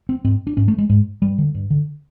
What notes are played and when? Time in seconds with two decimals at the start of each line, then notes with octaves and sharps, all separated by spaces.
0.09 C4
0.24 G#2 C4
0.47 D4
0.57 G#2 C#4
0.68 A3
0.78 G#3
0.90 G#2 G#3
1.22 G2 G3
1.38 D3
1.55 G2
1.70 D3